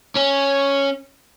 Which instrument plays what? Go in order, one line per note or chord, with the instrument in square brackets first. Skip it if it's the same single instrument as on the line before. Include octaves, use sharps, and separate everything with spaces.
[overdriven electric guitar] C#4